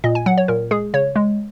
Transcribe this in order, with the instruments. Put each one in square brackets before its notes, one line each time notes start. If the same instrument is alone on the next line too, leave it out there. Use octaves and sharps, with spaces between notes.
[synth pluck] A#2 D#5
G#5
F#3 F#5
C#5
A#2 A#4
G#3 G#4
C#3 C#5
G#3